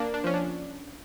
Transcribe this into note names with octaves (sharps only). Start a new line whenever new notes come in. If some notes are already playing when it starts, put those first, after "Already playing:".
Already playing: A#3 D4
D4
F3 C#4
D4